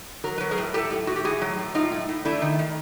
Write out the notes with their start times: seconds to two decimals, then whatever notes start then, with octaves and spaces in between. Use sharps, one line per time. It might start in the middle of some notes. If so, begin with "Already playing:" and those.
0.24 F#3 A#4
0.38 F#3 B4
0.51 G#4 A#4
0.58 A2
0.74 A2 G4 A4
0.91 A2
1.07 A2 F#4
1.16 G4
1.24 A2 F#4 G#4
1.41 F#3
1.59 A2
1.75 A2 D#4 F4
1.92 A2
2.09 A2
2.25 A3 D4 E4
2.42 D#3
2.59 D#3